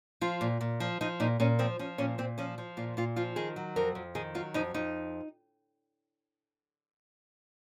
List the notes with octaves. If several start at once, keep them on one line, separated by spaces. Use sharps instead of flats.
F3 F4
A#2
A#2
F3
F3 D#4
A#2 D#4
A#2 C#4
F3 C4
F3 C#4
A#2 C#4
A#2 C4
F3 C#4
F3
A#2 F4
A#2 F4
F3 F4
D#3 G#4
F#3
F2 A#4
F2
D#3 G#4
F#3 F4
F2 D#4
F2 D#4